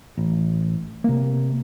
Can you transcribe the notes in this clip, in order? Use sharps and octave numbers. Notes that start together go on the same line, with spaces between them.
A1
C3 A#3